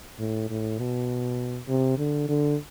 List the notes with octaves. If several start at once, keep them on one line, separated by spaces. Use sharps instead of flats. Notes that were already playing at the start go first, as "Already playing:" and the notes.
A2
A2
B2
C3
D3
D3